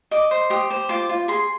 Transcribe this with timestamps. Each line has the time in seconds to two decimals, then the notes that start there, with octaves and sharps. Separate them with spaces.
0.11 D#5 D6
0.31 C5
0.50 G4 D#6
0.71 C5
0.89 F4 D6
1.09 F4
1.28 G#4 C6